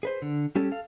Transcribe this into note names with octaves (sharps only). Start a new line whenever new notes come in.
G#4 B4 C5
D3
G3 C#4 G4 A4
A4 F5